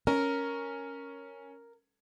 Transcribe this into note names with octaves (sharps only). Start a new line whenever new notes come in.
C#4 A#4